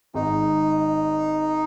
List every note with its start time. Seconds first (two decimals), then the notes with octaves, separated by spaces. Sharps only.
0.14 G#1 G#2 D#3 G#3 D#4